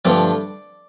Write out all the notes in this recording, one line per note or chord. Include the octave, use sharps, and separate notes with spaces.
G2 D3 F3 A3 D5